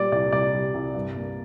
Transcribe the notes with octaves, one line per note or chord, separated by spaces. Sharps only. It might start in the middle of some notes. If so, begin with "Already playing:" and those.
Already playing: A#2 G3 D5
C2 D5
C2 D5
G3
C2
G2
A#3